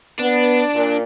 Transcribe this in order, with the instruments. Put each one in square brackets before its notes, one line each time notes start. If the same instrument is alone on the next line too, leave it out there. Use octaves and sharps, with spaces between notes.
[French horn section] B3 [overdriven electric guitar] D4
[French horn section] A#2